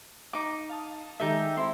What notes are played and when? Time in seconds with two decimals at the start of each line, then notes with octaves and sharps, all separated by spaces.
0.33 D#4 D6
0.69 F5 A5 D#6
1.20 D#3 G#3 D#4 G4 A4 E5
1.57 C4 E4 C6